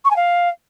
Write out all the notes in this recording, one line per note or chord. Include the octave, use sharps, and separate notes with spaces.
C#6
G#5
F5